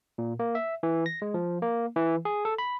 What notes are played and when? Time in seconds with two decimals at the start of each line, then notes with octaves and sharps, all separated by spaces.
0.18 A#2
0.39 A#3
0.55 E5
0.83 E3
1.06 A#6
1.22 G#3
1.34 F3
1.62 A#3
1.96 E3
2.25 G#4
2.45 A4
2.58 B5